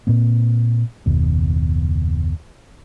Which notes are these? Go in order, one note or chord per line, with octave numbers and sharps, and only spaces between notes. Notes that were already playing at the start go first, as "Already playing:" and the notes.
A#2 A#3 C4
F#1 D#2 B2